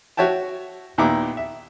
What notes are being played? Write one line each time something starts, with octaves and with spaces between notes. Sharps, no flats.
F#4 C#5 E5 G5 A5
D#2 A#2 D#3 B3 E4 D6
E5